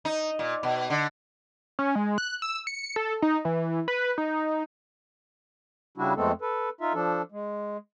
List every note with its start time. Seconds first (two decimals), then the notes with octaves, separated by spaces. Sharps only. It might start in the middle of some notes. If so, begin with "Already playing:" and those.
0.05 D#4
0.39 A#2
0.63 B2
0.90 D3
1.79 C#4
1.95 G#3
2.18 F#6
2.42 E6
2.67 C#7
2.96 A4
3.22 D#4
3.45 E3
3.88 B4
4.18 D#4
5.97 C#3 G3 D4 E4 F#4
6.16 F2 G#3 A3 B3 C4 A4
6.41 A4 B4
6.81 D#4 F4 E5
6.94 F3 D4 A4
7.32 G#3